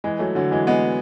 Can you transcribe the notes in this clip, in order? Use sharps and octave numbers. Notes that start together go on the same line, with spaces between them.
E3 G#3
F#3 A3
D3 F#3
E3 G#3
G#3 B3